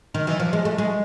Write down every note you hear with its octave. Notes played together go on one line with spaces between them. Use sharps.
D#3
E3
F3
G#3
A3
G#3